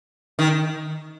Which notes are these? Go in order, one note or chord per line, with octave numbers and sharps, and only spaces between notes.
D#3